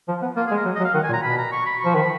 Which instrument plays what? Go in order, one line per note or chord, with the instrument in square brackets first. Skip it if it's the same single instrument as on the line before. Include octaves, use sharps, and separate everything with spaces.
[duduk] F3
B3
[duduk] A#3 [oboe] F4
[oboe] G#4
[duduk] G#3
[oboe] A#4
[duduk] F#3
[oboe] D#5
[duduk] F#3
[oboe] F5
[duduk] D#3 [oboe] F#5
[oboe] G#5
[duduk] A#2
[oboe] A#5
[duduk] B2 [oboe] B5
[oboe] A#5
C#6
B5
[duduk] F3 [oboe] C#6
[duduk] D#3 [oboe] B5